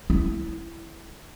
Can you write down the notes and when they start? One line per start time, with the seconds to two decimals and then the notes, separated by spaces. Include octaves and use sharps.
0.10 E4